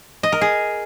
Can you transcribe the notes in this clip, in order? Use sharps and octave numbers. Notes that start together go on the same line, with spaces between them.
D#5
A#4
G#4